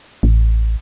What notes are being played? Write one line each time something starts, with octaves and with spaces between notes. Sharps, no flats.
A1